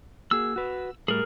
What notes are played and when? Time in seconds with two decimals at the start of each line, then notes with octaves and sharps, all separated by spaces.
0.31 A#3 F#4 G#4 E6
0.56 F#4 B4
1.08 A2 G3 G#4 A#4